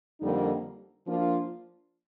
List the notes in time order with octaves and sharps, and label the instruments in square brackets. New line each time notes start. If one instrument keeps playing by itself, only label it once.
[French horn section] F2 D3 G3 A#3 D#4
F3 A#3 D4 F4